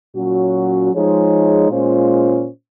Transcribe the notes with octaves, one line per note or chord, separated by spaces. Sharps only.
A#2 F#3 C#4 F#4
F3 G#3 D#4 G#4 C#5
A#2 G#3 C#4 F4 C5